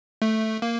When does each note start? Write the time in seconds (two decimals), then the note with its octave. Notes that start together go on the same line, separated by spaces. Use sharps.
0.22 A3
0.62 A#3